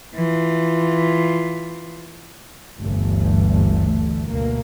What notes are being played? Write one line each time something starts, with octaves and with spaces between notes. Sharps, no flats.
E3 F4
G1 D2 E3 A3
D2 B2 A#3